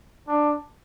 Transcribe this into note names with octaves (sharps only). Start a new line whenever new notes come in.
D4